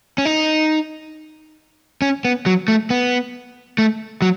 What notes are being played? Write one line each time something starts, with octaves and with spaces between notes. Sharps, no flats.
C#4
D#4
C#4
B3
F#3
A3
B3
A3
F#3